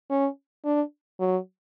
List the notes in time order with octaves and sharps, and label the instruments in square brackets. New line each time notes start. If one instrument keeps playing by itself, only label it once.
[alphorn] C#4
D4
F#3